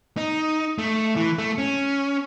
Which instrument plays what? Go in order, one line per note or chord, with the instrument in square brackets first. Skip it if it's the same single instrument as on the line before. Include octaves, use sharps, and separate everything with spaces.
[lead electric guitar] D#4
A3
E3
A3
C#4